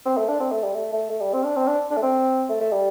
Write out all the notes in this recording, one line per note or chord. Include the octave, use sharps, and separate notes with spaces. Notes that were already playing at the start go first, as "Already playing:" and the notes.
C4
A3
D4
C4
A3
G3
A3
A3
A3
G3
C4
D4
C4
D4
D4
A3
C4
A3
A3
G3